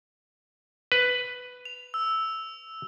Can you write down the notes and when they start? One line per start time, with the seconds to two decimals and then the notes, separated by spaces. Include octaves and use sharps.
0.92 B4
1.65 F7
1.94 E6